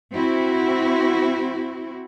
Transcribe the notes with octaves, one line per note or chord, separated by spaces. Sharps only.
C4 E4 F#4